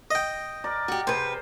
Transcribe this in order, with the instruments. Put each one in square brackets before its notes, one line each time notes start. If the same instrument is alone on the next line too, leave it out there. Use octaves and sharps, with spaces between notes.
[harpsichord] D#5 G5
[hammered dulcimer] A#4 D5
[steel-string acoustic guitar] F#4 G4
[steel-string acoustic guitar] C3 B4 [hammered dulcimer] G#4 C5